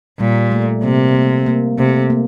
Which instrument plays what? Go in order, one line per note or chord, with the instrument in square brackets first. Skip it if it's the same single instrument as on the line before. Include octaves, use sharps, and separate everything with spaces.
[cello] A#2 [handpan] G3
[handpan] A3
[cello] C3 [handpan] A#3
[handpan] A#3
A#3
[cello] C3 [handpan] A3
[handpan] A#3